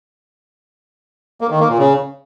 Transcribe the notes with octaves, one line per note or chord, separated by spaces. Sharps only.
A#3
D#3
A#3
A#2
C#3